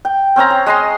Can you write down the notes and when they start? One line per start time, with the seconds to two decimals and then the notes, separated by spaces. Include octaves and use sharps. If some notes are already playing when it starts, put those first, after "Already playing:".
0.05 G5
0.36 C4 C#4 C5 A#5
0.50 C#5
0.66 G#3 D#5 C6